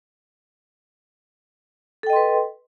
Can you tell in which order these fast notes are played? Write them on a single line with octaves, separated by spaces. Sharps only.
A4 G5 D#5 C6 B4